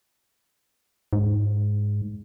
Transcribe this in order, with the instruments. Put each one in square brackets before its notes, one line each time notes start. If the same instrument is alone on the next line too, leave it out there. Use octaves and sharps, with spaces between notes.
[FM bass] G#2